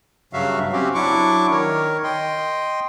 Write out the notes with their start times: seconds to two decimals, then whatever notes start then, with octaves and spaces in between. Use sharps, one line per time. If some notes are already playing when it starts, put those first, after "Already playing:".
0.33 G2 C#3 F#3 F#4 E5 F5
0.73 C4 C#4 F#4 G4
0.95 F#3 D4 E4 C#6 D6
1.51 D#3 A#4 C#5
2.04 D#5 G5 C6